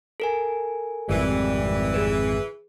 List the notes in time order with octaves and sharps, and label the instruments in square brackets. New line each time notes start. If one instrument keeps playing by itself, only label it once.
[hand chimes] A4 A#4 G#5
[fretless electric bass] G#1 F2 C3 [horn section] E3 [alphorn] G3
[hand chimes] G#4 B4